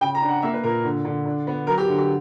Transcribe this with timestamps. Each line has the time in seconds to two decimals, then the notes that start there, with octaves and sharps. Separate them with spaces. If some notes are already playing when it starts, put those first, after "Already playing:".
0.01 C#3 G5
0.15 A#5
0.22 D4
0.29 F#5
0.42 A#3 E5
0.53 B4
0.64 A#2 A#4
0.84 D3
1.05 D3
1.26 D4
1.47 B3
1.67 F#3 A#4
1.78 G4
1.88 D3
1.98 G4